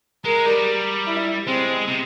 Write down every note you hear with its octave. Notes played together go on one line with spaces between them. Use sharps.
G#3 A#4
G3
E4
G#3 C4
C3